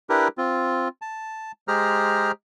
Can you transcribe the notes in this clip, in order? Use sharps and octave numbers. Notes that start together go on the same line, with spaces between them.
D4 E4 G4 A#4 B4
C4 F4
A5
G#3 G4 G#4 C5 A#5 F6